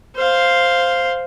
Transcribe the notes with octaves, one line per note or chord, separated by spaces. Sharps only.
C5 F5